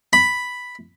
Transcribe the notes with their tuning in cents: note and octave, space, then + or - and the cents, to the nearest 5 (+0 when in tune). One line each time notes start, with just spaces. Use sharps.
B5 +0